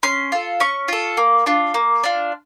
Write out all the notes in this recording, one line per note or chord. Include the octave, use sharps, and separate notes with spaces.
C#4 C6
F4 A4
C#4 C#6
F4 A4
A#3
D4 F4
A#3
D4 F4